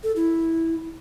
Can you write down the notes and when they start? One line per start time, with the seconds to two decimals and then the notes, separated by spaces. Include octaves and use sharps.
0.04 A4
0.16 E4